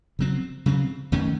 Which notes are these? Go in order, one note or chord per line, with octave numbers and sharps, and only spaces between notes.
C#3 F#3 C4
C#3 F#3 C4
F#2 D#3 A3 C#4